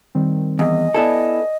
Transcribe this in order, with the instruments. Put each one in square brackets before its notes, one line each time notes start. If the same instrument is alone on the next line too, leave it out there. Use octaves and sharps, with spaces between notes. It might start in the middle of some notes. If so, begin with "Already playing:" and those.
[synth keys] D#3 G3 C4
[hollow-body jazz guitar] E2 [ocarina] D#5
[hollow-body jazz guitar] B3 E4 A4 [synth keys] D5 G#5